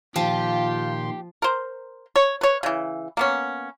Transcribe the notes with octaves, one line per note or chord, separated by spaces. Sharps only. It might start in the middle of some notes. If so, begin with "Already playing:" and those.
A#2 D#3 F3 F4 G4 C6
A#4 C5
C#5
B4 C#5
C#3 E3
A#3 B3 C#4